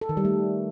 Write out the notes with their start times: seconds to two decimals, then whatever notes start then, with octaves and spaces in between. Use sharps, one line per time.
0.01 A4
0.09 D#3
0.17 G3
0.25 A3